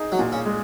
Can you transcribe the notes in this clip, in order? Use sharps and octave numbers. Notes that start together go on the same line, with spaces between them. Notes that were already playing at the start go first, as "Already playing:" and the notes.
Already playing: D#4 G#4
F#3
A#2
C#3
G#3